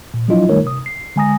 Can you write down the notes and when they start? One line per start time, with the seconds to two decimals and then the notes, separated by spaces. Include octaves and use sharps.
0.14 A#2
0.28 F3 F#3 D4 E4 F4 D#5
0.49 D#3 G3 A3 D#4 A#4 C#5
0.64 C3 D#6
0.86 C7
1.16 D3 G#3 G#5 A#5 D#6 A#6